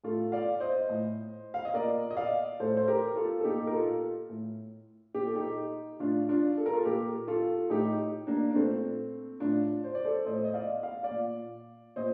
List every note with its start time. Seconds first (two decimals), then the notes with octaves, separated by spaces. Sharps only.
0.04 A2 F4 A4
0.32 D5 F5
0.60 C5 D#5
0.89 A2
1.54 F5
1.65 D#5
1.74 A#2 A#4 D5
2.10 D#5
2.16 D5 F5
2.60 A2 A4 C5
2.77 C5
2.88 G4 A#4
3.16 F4 A4
3.41 A4
3.44 A#2 D#4 G4
3.67 A#4
3.74 F4 A4
4.29 A2
5.14 A#2 G4
5.26 A4
5.35 D#4 G4
6.00 A2 D4 F4
6.29 D4 F4
6.58 A4
6.66 A#4
6.73 F4 A4
6.85 A#2 G4 A#4
7.27 F4 A4
7.70 A2 D#4 G4
8.27 A#3 D4
8.51 D4
8.55 A#2 A3 C4
9.40 A2 D4 F4
9.84 C5
9.95 D5
10.04 A4 C5
10.26 A2 C5 D#5
10.45 D#5
10.54 D5 F5
10.83 F5
11.03 D5 F5
11.10 A#2
11.96 A#2 C5 D#5